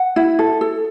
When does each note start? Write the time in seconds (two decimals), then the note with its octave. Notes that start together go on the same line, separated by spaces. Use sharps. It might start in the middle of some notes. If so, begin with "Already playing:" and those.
Already playing: F#5
0.16 E4
0.39 A4
0.61 A4